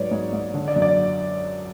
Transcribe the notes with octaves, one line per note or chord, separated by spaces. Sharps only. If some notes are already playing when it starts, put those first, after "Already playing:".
Already playing: G#2 F#3 B4 C#5 D5
G#2
G#2
D3
D5
F#2
D5